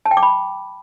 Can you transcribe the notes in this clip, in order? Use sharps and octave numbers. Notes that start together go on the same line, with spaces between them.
A5
G5
D6
B5